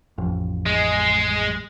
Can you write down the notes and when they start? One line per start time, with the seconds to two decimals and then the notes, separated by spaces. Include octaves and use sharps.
0.18 A1 F2
0.66 G#3